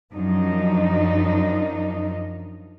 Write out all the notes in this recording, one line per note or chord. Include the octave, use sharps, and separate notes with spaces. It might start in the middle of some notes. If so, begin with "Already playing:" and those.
F#2 F3 D4 D#4